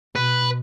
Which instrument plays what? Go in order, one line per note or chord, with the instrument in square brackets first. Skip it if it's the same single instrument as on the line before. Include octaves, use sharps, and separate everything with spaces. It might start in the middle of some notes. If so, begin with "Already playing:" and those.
[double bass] B2 [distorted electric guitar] B4